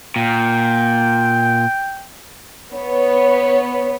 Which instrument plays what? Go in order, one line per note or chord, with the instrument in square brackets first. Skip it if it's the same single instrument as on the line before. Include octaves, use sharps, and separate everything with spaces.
[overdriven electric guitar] A#2 [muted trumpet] G5
[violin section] B3 C#5